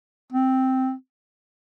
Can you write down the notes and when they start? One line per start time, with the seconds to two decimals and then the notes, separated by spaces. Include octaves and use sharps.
0.32 C4